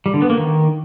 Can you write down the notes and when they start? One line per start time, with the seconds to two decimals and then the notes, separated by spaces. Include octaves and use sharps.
0.06 G3
0.14 D3
0.22 B3
0.30 A#3
0.38 D#3